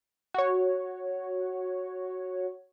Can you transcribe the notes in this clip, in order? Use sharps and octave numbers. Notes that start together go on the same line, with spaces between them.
F#4 C#5